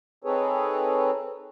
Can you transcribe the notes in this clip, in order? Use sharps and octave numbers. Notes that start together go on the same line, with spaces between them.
C4 D#4 G#4 A4 B4 C#5